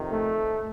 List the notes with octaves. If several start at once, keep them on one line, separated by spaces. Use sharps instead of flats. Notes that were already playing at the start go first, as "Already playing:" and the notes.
Already playing: F2 C3 D#3
A3